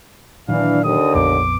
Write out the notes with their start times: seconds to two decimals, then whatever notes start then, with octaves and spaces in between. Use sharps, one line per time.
0.49 A#2 D#3 E3 F#3 D4 F5
0.84 D#2 D3 D#6
1.15 A#1 F2 B3 D6